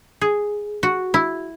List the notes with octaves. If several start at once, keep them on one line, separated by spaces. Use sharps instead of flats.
G#4
F#4
E4